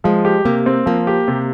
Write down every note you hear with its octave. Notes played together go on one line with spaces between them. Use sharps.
F3 G#3
G4
C3 A#3
C4
F3 A#3
G4
C3